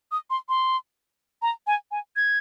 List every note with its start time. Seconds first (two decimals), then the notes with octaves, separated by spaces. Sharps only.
0.12 D#6
0.30 C6
0.49 C6
1.42 A#5
1.67 G#5
1.91 G#5
2.16 G#6